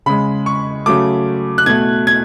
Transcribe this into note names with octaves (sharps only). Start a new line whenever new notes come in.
C#3 G#3 B5
C#6
C#3 F#3 A3 D6
F#6
B2 A3 G#6
G#6